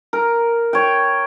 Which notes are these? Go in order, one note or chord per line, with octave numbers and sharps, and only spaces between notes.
A#4
C#5 G5